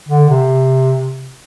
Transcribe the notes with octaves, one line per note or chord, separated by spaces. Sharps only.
D3
C3